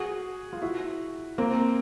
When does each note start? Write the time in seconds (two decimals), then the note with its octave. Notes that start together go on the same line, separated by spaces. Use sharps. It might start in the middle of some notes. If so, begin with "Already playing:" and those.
Already playing: F#4 G#4
0.53 F4
0.62 E4 F#4
1.38 A#3 C4